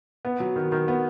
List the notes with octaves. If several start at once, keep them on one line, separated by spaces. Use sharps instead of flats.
B3
F#3
D#3
D#3
B3